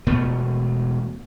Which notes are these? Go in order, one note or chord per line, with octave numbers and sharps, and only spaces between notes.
E1 B2 A3 B3